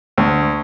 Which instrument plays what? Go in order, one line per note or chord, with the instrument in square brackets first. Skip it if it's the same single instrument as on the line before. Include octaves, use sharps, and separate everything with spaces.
[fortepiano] D2